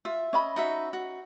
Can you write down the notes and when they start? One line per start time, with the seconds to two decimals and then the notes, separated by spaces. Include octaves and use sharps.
0.05 F4 E5
0.33 C#4 D#5 B5
0.56 D#4 F#4 E5
0.93 F#4